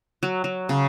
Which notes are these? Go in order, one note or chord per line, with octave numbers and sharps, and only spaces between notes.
F#3
F#3
C#3